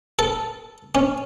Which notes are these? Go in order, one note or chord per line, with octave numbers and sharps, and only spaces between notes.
A4
C#4